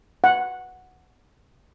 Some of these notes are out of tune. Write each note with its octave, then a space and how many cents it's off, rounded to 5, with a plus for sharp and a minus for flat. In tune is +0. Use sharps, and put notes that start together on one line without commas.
F#5 -5